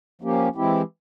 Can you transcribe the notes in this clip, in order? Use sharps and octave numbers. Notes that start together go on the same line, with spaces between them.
F3 A#3 C#4 G4
E3 G#3 C4 E4 G4